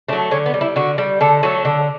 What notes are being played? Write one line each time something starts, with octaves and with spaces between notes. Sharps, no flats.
F#3 A3 D4
D3 C#4
B3
G3
E4
D3 F#4
G3
D3 A4
F#3 A3 A4
D3